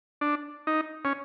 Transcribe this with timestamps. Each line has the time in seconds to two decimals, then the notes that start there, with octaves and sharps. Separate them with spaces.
0.21 D4
0.67 D#4
1.05 C#4